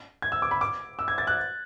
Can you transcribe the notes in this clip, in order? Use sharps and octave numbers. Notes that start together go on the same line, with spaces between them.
G#6
E6
D6
B5
D6
E6
G#6
A6
F#6